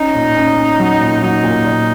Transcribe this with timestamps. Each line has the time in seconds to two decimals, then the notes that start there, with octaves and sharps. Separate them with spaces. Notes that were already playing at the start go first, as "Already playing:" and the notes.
Already playing: C#4 D#4
0.15 A#2
0.36 C#4
0.58 C#4
0.80 F#3
1.01 A#2
1.22 F#3 D#4
1.44 A#2
1.65 A#2